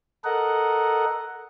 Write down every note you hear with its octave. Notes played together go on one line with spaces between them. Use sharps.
A4 A#4 D#5 F#5